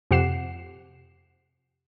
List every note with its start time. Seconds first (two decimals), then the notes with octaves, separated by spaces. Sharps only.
0.11 F2 C3 G4 F#5 C7 E7